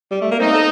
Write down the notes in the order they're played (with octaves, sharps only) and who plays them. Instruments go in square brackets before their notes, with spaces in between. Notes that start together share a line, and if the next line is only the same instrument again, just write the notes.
[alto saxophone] G3
A3
A#3
[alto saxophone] C4 [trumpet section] D#4
[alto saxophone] A4